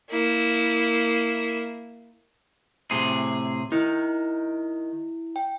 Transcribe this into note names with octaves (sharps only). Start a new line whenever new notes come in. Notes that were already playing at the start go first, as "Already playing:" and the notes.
A#3 E4
A2 C3 G#4
D#3 E4
G5